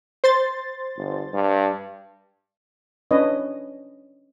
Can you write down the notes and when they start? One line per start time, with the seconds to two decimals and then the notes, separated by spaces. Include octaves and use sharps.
0.24 C5 C6 A6
0.96 G1
1.34 G2
3.11 C#4 D4 B4 C#5 D#5